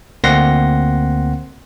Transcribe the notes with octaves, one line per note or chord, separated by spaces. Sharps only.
D2 A#3 C4 F#5 C6 A#6